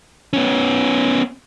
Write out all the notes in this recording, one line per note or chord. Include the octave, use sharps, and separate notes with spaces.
B3 C#4